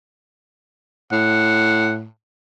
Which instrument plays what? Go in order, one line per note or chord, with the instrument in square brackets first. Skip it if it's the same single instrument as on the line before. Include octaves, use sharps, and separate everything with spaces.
[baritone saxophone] A2 [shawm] F#5